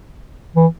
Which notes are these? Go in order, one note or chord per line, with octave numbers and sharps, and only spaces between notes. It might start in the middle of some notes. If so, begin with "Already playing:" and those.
E3